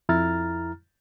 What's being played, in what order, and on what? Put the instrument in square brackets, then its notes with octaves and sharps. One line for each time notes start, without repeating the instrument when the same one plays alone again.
[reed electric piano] F2 E4 A#5 F6 A6